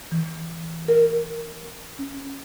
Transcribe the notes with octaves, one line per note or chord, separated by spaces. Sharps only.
E3
A#4
C#4